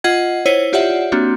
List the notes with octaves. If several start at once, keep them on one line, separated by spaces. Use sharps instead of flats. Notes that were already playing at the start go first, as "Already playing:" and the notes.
F4 D#5 F#5 G#6
E4 C5 C#5 D#7
F4 G4 C#5 D5 E5 F#5
A#3 C4 D4 F#4